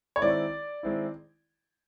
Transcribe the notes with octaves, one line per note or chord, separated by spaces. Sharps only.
C#5
D#3 G#3 C4 E4 D5
D#3 G#3 C4 E4